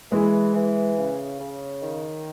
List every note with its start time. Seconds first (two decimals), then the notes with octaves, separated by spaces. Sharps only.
0.12 E3 G#3
0.55 E3
0.97 C#3
1.39 C#3
1.82 D#3